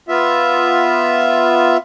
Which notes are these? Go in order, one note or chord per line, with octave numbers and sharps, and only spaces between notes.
B3 F4 E5